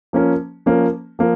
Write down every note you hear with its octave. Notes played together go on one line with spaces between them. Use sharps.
F3 A#3 C#4
F3 A#3 C#4
F3 A#3